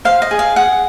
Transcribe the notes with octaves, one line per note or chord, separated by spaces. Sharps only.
C5 F5
D#5
G#4
F5
G#4 F#5